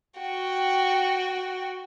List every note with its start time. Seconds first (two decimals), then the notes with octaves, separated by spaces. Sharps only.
0.20 F#4 G5